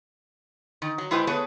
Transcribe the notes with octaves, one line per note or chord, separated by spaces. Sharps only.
D#3
F#3
G#3 E4 G4 B4 C5
A3 B3 G#4 B4 C#5